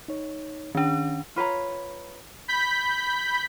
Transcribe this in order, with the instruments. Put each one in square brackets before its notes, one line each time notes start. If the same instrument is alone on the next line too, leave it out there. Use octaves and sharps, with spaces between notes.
[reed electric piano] D#4 C#5
[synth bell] D#3 D4 [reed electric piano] C#4
[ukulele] F4 B4 C#5 A#5
[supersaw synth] B5 G6 B6